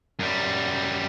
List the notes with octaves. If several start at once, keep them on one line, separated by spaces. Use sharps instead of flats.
F#2 G3